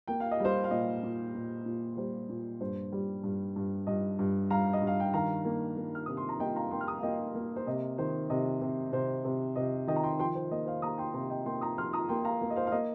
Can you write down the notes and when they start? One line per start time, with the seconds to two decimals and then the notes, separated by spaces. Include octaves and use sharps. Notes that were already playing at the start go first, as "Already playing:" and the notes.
0.08 A#3 G5
0.20 F5
0.31 D#5
0.40 G3 C5 F5
0.64 F5
0.71 A#2 D#5
1.03 A#2
1.35 A#2
1.66 A#2
1.97 G3 C5
2.30 A#2
2.61 G2 C5
2.92 G3
3.23 G2
3.56 G2
3.87 G2 D#5
4.19 G2
4.50 G3 F5 A#5
4.73 D#5
4.82 G2
4.87 F5
5.00 G5
5.14 D#3 F5 A#5
5.45 A#3
5.77 A#3
5.95 F6
6.06 C3 D#6
6.17 C6
6.29 A#5
6.40 A#3 D#5 G5
6.56 F5 A#5
6.71 A#3 G5 C6
6.81 F6
6.87 A#5 D#6
6.99 F5
7.03 A#3 D#5 G5
7.35 A#3
7.56 C5
7.66 C3 D#5
7.98 D#3 C5
8.30 C3 D#5
8.62 C3
8.92 C3 C5
9.24 C3
9.56 C3 D#5
9.87 D#3 D#5 G5
9.96 A#5
10.03 G5 C6
10.19 F3 G5 C6
10.35 C5
10.51 A#3 D#5
10.66 C5 F5
10.82 A#3 A#5 D#6
10.98 G5 C6
11.14 C3 G5 C6
11.30 D#5 G5
11.46 A#3 G5 C6
11.61 A#5 D#6
11.77 F3 C6 F6
11.93 A#5 D#6
12.09 A#3 G5 C6
12.24 F5 A#5
12.41 A#3
12.50 D#5
12.56 C5 F5
12.67 F5
12.72 A#3 D#5